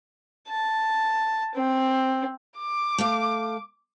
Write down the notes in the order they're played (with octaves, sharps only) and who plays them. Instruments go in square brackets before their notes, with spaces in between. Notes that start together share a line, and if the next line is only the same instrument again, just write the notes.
[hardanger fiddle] A5
C4
[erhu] D6
[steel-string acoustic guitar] A3 F5